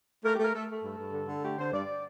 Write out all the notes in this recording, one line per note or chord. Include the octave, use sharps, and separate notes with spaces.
A3 A#4
A3 G4
A#4
A3 A4
A3 A4
G2
G2
D3
D3
A3 G4
D3 C5
G2 D5